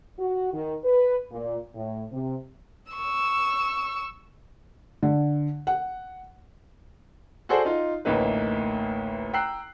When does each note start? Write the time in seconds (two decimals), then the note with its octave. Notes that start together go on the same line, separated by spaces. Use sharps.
0.19 F#4
0.53 D#3
0.84 B4
1.31 A#2
1.75 A2
2.12 C3
2.93 C#6 E6
5.03 D3
5.67 F#5
7.49 F#4 G#4 A4 C5 D5 F#5
7.65 D#4 F4
8.05 A1 D2 A#3 D#4 B4
9.34 G5 A#5 E6 F#6 C7